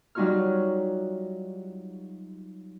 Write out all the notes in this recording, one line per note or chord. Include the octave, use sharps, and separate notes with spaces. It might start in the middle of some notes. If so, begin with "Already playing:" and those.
F#3 G3 D#4 F4 C#5 F6